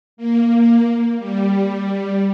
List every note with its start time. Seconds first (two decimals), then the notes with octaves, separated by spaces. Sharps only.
0.17 A#3
1.18 G3